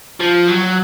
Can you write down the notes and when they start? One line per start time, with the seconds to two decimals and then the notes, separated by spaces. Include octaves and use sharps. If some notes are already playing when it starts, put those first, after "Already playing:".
0.20 F3
0.48 F#3